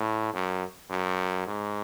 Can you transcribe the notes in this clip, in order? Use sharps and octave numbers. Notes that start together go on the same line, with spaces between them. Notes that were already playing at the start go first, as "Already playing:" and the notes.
Already playing: A2
F#2
F#2
G#2